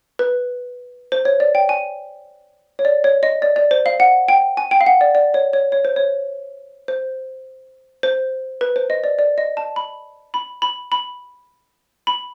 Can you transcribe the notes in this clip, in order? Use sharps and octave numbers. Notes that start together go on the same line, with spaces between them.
B4
C5
C#5
D5
G5
G#5
C#5
D5
C#5
D#5
D5
D5
C5
F5
F#5
G5
G#5
G5
F5
F#5
D5
D5
C#5
C#5
C#5
C5
C#5
C5
C5
B4
C5
D#5
D5
D5
D#5
A5
B5
B5
B5
B5
B5